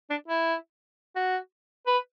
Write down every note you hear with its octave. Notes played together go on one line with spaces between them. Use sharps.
D4
E4
F#4
B4